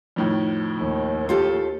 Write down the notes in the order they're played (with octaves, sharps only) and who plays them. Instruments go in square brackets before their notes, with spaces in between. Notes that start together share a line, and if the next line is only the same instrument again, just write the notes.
[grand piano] F2 A2 D#3
[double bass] D#2
[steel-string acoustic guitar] F4 G4 A4